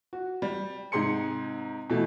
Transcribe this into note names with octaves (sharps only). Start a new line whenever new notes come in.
F#4
G3
G#2 C3 G#4 C6 C#7
B2 E3 A3